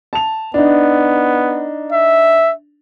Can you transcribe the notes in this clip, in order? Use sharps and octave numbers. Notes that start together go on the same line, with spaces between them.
A5 F7
B3 D4 D#4
E5